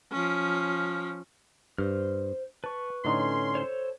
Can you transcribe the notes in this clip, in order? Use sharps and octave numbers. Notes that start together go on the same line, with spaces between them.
F3 C#4
G2 C5 F6
B4 A5 C#6
A2 D3 C#4 D#4 C6
A4 C5 C#5